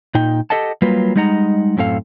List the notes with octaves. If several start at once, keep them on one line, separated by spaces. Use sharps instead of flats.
A#2 D#4 G5
G4 A4 D#5 F#5 A5
F#3 G3 A#3 F4 B4
G3 G#3 D#4 D#5 F#5 A#5
F#2 A2 C4 A4 F5